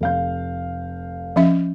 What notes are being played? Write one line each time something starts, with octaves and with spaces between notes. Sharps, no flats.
F1 F5 G6
F3 C#4 E5